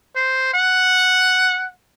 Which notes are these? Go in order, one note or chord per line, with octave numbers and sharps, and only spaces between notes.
C5
F#5